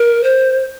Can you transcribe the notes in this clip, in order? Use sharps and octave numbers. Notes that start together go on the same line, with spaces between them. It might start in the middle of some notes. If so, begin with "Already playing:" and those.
Already playing: A#4
C5